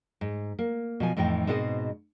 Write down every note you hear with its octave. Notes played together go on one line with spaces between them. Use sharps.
G#2
A#3
B2 F3 G#5
F2 A2 E3 D#4 G5
G#2 B2 G#3 C4 B4 D#5